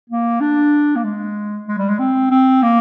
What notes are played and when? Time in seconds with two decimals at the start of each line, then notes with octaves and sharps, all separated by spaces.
0.10 A#3
0.41 D4
0.96 A#3
1.04 G#3
1.68 G#3
1.78 G3
1.89 G#3
1.99 C4
2.31 C4
2.63 A#3